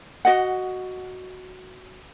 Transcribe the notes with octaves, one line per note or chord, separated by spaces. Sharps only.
F#4 D#5 F#5